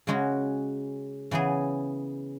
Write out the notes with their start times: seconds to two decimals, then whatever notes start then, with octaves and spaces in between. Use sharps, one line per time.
0.07 C#3 G#3 C#4 F#4
1.31 C#3 E3 B3 G#4